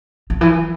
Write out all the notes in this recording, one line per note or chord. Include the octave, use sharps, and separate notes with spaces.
D3
E3